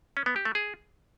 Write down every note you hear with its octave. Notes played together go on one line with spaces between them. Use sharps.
C#4
B3
G4
A3
G#4